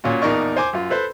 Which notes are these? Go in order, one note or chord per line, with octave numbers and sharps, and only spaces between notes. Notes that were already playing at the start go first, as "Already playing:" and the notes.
A#2 C#4 F4 F#4
A#1 E2 D#4 A#4 D5 C#6
C5 G#5 D6
F#2 F4
A4 B4 C5